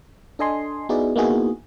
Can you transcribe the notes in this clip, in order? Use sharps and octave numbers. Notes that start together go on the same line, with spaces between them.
D4 A4 D#5 G#5 C6
B3 D#4 E4 F#4 G#4 D5
A#3 B3 D#4 E4 F#4 G#4